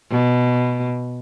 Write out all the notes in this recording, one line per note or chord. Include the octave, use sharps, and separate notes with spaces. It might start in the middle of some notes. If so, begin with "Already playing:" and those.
B2